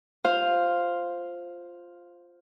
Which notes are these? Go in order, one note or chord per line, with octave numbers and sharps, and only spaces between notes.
F4 C5 F5